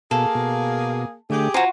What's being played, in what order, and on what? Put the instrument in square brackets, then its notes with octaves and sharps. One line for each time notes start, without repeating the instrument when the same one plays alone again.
[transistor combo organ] B2 [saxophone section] A#3 G#4 [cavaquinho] A4
[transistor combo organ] B2
[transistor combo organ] D3 A3 [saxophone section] G4 G#4
[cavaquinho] F4 F#4 [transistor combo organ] C5 G#5 A#5